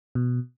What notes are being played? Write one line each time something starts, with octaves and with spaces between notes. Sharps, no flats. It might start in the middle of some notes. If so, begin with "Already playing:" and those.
B2